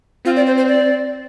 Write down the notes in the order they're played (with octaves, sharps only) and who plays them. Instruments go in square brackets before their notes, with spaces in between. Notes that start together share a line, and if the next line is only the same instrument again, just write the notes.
[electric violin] C4 [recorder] F4
[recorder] D5
C5
C5
D5